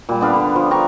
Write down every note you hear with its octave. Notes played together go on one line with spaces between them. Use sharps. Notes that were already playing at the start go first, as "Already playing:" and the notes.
A#2 G3
B3 D4 F5 B5
D3
F3
D4 G5 A#5 C#6